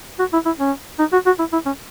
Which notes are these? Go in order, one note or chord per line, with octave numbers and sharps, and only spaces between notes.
F#4
E4
E4
C#4
D#4
F#4
F#4
E4
E4
C#4